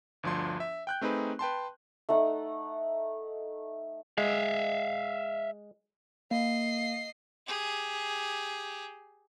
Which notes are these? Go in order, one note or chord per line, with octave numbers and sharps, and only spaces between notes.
G1 D2 F3 D4 C6
E5
G5 F#6 G6
A3 C4 D#4 G#4 B4
B4 G5 A5 C6
A3 D#4 F#5
G#3 E5 F5
A#3 D#5 C7
G4 G#4